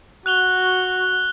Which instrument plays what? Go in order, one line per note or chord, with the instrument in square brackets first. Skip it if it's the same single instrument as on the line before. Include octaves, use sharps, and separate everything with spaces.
[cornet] F#4 [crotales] F#6 F7 G7